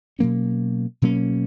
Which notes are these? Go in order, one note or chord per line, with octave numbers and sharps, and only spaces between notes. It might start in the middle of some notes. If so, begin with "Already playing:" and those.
B2 F#3 A#3 C#4
B2 F#3 A#3 C#4